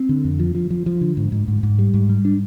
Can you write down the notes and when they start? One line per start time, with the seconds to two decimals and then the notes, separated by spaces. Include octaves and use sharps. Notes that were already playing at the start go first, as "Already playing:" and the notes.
Already playing: C4
0.09 D3
0.24 F2
0.39 F3
0.55 F3
0.70 F3
0.86 F3
1.01 D3
1.17 G#2
1.32 G#2
1.48 G#2
1.63 G#2
1.79 G3
1.94 G#2
2.09 G3
2.25 D4